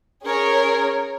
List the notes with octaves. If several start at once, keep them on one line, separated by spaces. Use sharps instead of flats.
C#4 G#4 A#4 C#5